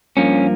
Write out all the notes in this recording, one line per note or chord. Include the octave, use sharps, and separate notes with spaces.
G2 F3 A#3 C#4